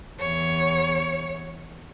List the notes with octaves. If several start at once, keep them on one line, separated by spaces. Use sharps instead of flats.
E2 C#5